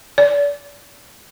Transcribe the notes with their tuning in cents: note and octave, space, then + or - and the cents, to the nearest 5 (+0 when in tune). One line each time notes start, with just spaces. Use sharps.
D5 -35